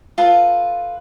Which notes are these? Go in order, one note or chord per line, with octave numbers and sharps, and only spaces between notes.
F4 A4 B4